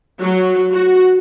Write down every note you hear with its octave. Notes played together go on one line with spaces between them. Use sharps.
F#3
F#4